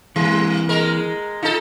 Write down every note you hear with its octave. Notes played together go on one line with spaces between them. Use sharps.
E3 G3 A#3
G#3 A#4
D#4 F4 A4